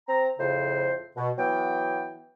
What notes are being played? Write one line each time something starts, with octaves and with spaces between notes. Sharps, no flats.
C4 A#5
F2 A2 C#3 C5
B2
E3 F#3 B3 G5